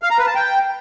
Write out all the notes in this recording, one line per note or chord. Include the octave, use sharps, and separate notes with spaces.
F5
A#5
B4
A5
G5